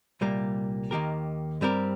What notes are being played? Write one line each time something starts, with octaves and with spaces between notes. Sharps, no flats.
C2 A#2 G3 A#3
D#2 D#3 A#3 G4 A#4
G2 G3 C4 G4 A#4